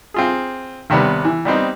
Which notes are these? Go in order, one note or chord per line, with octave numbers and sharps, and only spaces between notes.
C4 F4 G#4
D#2 C3 D#3 G3 B3
E3
G3 B3 C4 D#4